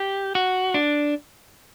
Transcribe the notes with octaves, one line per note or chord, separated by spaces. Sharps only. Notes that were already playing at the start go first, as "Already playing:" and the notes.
Already playing: G4
F#4
D4